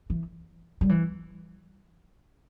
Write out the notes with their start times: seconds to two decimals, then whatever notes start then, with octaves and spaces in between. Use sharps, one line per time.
0.10 E3
0.81 G3
0.89 E3